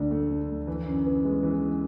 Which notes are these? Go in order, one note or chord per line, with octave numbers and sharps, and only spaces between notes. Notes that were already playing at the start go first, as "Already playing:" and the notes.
Already playing: D2 D3 D4
A3
D3
D2
E3
F#2
B3
G#3
E3